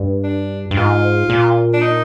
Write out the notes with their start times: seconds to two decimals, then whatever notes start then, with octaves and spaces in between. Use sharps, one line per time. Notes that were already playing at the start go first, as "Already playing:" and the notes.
Already playing: G2
0.24 D4
0.71 G2
0.77 G#2 F4
1.30 A#2
1.74 D4
1.82 D#4